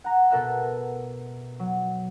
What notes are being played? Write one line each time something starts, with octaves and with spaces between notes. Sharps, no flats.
F#5 A#5
B2 A4 A#4 E5 F#6
F#3